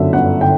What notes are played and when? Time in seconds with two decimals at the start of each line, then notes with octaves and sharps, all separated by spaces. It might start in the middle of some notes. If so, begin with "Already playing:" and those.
Already playing: G1 F#2 D3 E5
0.13 G1 F#5
0.41 D3 G5